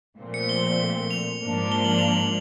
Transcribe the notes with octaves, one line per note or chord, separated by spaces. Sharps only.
A#2 F3 A3 C4
C#7
G7
F7
G#2 F3 A#3 D4
G7
F#7
F7
F#7